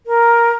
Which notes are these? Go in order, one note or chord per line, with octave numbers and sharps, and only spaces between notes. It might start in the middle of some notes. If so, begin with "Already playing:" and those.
A#4